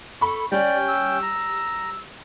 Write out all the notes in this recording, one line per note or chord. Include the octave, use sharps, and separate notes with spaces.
A4 B5 C#6
G3 C#4 D5 G5
E6
A#5